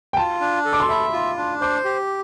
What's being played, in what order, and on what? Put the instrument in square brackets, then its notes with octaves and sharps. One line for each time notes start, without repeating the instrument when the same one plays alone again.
[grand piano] G5
[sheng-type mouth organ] F4 [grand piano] A5
[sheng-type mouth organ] D4
A4
[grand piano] D6
C6
[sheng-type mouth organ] E5 [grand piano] B5
[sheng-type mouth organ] F4
D4
[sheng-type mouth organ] C5 [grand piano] D6
[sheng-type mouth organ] G4